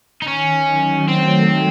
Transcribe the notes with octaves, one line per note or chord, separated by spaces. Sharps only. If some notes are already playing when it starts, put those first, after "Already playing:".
D#4
D#3 C#4
F#3
A3 C4